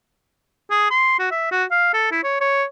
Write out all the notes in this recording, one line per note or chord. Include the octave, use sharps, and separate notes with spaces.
G#4
C6
F#4
E5
F#4
F5
A4
E4
C#5
C#5